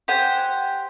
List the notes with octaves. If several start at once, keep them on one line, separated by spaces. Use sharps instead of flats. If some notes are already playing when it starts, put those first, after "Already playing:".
G4 C5 F#5 G#5